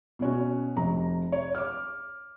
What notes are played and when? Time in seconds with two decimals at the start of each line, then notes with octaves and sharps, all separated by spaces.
0.19 B2 B3 C#4 F#4
0.76 F1 A#5
1.32 C#5
1.55 D6 F6